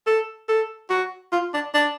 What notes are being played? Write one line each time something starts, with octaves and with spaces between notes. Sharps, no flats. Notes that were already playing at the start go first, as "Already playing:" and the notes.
A4
A4
F#4
F4
D4
D4